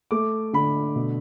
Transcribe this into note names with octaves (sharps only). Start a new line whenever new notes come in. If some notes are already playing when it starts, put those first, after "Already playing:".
A3 D6
D3 B5
B2